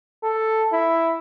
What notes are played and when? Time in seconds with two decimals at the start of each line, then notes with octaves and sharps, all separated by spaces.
0.23 A4
0.72 E4